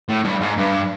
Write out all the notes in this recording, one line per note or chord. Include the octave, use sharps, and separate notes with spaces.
A2
G2
G#2
G2